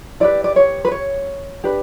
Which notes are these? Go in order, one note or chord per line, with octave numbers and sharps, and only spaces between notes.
E4 G4 B4 D5
D5
C#5
B4
C#5
D4 G4 B4